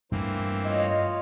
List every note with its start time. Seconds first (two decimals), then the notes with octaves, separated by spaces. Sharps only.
0.12 G2 E3 A3 A#3 C4
0.65 F4 C#5 D#5